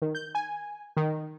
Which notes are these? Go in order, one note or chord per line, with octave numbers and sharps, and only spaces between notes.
D#3
G6
G#5
D#3